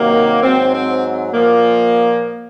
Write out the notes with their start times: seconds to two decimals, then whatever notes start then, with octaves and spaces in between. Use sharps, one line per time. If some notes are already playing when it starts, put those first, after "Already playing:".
Already playing: C3 D#3 F#3 A#3
0.43 G#2 F#3 C4
0.73 C4
1.33 A#2 F3 A#3